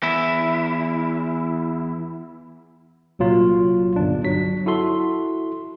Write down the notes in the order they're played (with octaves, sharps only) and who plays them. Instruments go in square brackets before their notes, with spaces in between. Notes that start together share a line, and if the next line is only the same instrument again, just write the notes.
[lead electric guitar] E2 E4
[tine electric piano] C2 A#2 F#3 F4
G1 D4
F#3 B6
E4 F#4 A4 C6